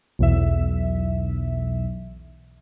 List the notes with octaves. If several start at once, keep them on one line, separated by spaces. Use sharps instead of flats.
B1 E2 E5